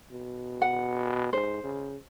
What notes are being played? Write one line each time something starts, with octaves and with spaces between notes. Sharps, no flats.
B2
F#5
G#2 C5
C#3